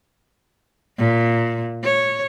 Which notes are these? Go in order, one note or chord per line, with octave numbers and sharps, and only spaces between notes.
A#2
C#5